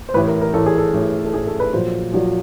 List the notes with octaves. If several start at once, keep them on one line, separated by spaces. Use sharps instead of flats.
C5
A1 A2 E3 B4
A#4
A#4
A1 A2 E3 A4
G#4
A4
A1 A2 E3
A4
A1 A2 E3 G#4
A4
B4
A#1 A#2 F#3 C5
A#1 A#2 F#3